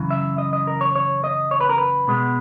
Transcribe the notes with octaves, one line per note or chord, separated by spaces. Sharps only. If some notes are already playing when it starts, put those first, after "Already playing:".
Already playing: F#2 C#3 E3
E5
D#5
D#5
A#4
C#5
C#5
D#5
C#5
B4
A#4
B4
B2 G#3 B3